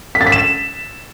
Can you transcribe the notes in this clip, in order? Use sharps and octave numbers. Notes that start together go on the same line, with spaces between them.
B6
A6
B6
E7